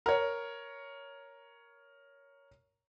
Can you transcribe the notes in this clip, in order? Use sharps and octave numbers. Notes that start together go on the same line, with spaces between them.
A#4 C#5